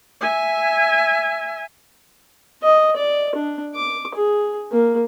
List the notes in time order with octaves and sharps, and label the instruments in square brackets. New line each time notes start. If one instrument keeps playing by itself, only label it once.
[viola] E5 G#5
[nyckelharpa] D#5
D5
D4
D6
G#4
A#3